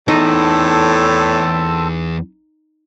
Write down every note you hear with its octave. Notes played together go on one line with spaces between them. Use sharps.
E2 A2 C4 D#4 A4 A5